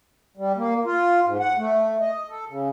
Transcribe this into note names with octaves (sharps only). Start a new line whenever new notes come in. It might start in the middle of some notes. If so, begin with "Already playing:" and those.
G3
A#3
F4
G#2
F#5
A3
D#5
A4
C#3